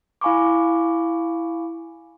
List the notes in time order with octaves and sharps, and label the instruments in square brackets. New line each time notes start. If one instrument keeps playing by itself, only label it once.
[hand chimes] E4 F5 G#5 B5 C#6 D6